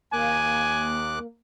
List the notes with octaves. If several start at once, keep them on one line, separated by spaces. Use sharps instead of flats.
D#2 A#3 G#5 D6 F#6